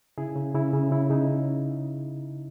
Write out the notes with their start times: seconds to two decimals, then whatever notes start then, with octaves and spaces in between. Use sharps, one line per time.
0.18 C#3 E4 G#4
0.36 C#3
0.55 C#3 E4
0.73 C#3
0.92 C#3 E4
1.10 C#3 D#4